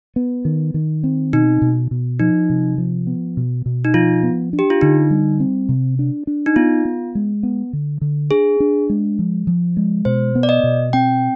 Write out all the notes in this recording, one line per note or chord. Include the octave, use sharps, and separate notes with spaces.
B3
D#3
D#3
C4
B2 D#4
B2
B2
F3 D#4
C3
F3
B3
B2
B2
D#4
F3 F4
B3
D4
G4
F4
D3 D#4
G3
C4
C3
D4
D4
D#4
B3 F4
B3
G#3
B3
D3
D3
D4 G#4
D4
G#3
F3
F3
G#3
B2 C5
B3
D5
D#5
B2
C4 G5